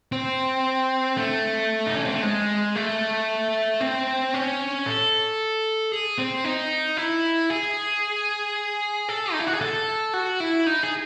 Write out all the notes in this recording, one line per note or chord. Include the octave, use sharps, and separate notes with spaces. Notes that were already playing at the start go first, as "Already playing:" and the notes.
C4
A3
D#4
C#4
C4
A3
G#3
A3
C4
C#4
A4
G#4
C4
D#4
E4
G#4
A4
D#4
E4
F#4
G#4
A4
F#4
E4
D#4
G#4